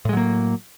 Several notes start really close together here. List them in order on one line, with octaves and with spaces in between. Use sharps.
A2 G#3 F#3 A#3